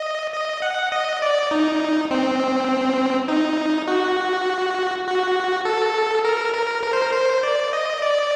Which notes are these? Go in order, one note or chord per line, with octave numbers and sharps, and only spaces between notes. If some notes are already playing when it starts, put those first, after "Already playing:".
Already playing: D#5
D#5
F#5
D#5
D5
D#4
C4
D#4
F#4
F#4
A4
A#4
A#4
A#4
C5
A#4
C5
D5
D#5
D5